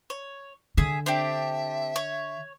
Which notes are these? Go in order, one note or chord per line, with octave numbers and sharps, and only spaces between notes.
C#5
D3 G#4 E5
C4 D4 G4 E5
C#5